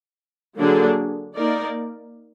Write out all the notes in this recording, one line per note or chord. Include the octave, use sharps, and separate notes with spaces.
D3 F#3 A#3 D4 G#4
A#3 D#4 A#4 D5